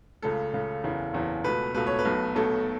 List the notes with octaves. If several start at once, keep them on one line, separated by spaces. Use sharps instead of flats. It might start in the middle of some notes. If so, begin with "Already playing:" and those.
C#2 C#3 A3 A4
C#2 C#3 A3
F#1 E2 C#3 E3
F#1 E2 C#3 E3
C#2 B2 A3 B4
C#2 B2 A3 B4
C#5
B4
B1 B2 F#3 A3
B1 B2 F#3 A3 A4